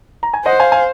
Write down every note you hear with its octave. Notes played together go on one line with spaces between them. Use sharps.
A#5
G#5
C5 D#5 F#5
F5 G#5
F5 G#5